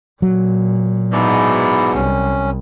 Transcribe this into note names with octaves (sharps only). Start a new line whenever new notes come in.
A#2 F#3
G#2 B2 E4 D5
C2 C#4